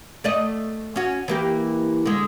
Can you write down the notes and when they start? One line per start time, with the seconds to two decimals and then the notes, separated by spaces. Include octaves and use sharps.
0.24 A3 D5 D#5
0.96 C#4 F#4
1.28 E3 A#3 G4
2.05 D3 G#3